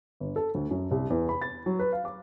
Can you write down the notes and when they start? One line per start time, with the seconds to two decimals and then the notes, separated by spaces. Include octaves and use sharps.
0.20 G1
0.36 A4
0.54 D2
0.71 F#2
0.91 C2
1.10 E2
1.29 B5
1.42 A6
1.66 F#3
1.79 B4
1.92 F5
2.05 D6